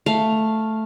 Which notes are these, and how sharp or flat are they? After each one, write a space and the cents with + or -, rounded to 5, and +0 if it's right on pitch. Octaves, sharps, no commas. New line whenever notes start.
A3 +0 F5 +0